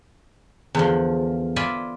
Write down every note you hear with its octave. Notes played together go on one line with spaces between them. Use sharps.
E2 D3 F3
F4 D5 E5 G#5 B5